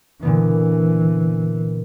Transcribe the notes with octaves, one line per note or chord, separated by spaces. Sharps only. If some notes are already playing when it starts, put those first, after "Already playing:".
A#2 D3 E3 B3